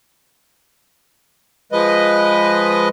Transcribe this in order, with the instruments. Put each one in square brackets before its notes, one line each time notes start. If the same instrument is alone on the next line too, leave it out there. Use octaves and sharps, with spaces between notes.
[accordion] F3 G#3 B4 D#5